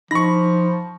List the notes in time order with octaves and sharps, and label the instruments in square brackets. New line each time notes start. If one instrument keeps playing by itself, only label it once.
[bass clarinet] F3 [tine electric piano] D#4 B5 [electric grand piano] C#6 A#6